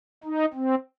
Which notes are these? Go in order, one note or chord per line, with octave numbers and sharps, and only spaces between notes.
D#4
C4